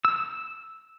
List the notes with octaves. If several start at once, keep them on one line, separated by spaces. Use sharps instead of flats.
E6